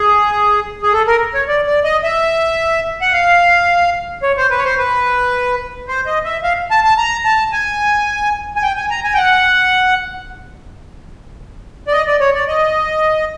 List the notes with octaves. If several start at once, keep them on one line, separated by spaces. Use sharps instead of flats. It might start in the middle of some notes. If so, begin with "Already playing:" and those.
Already playing: G#4
G#4
A4
A#4
C#5
D5
D5
D#5
E5
F#5
F5
C#5
C5
B4
C#5
C5
B4
C5
D#5
E5
F5
A5
A5
A#5
A5
G#5
G#5
G5
G#5
A#5
G#5
G5
F#5
D5
D#5
D5
C#5
D5
D#5